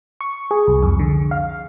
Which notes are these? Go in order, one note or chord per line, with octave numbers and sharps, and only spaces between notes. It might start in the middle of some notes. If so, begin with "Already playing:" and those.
C#6
G#4
C2
F2
D3
F5